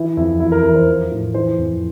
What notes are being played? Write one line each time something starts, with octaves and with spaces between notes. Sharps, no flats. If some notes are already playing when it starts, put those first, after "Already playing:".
Already playing: E3 E4
F2 E4
E2 E4
A#4
E2 A#4
C5
F3
A2
E3 C5
F2